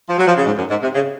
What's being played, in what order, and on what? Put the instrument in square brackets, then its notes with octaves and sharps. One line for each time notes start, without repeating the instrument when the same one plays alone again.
[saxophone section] F3
F#3
F3
C#3
G#2
F#2
G#2
C3
C#3